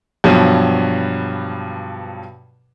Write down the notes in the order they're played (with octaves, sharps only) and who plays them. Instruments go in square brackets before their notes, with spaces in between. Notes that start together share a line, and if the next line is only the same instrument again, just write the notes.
[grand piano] G2 B2 F3 F#3